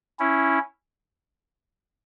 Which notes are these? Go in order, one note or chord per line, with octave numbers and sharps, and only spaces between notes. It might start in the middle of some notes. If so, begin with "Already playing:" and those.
C#4 E4